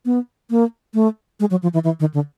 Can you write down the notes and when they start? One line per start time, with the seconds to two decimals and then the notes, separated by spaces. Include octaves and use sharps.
0.05 B3
0.50 A#3
0.94 A3
1.40 G#3
1.51 F#3
1.63 F3
1.74 E3
1.84 E3
2.00 D#3
2.14 D3